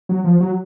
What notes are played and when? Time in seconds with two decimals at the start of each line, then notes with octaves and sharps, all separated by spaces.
0.09 F#3
0.24 F3
0.40 F#3